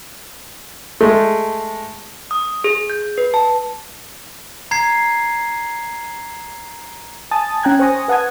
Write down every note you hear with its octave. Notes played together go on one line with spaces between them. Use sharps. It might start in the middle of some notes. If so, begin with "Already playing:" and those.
G#3 A3
D#6
G#4
G6
B4
A5
A#5 G#6 C7
G#5 A5 D#6 A6
C#4 G5 A#5 F#6 G#6
C5 G#5 C#6 D#6 A#6
B4 F#5 A5 D#6 G#6